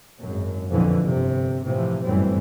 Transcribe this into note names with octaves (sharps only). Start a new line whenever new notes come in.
G#1 F#2
B1 F2 A#2 D3 E3 F3
G1 C3
A2 C3 E3 F3
G1 F#2 A2 E3 G3 C4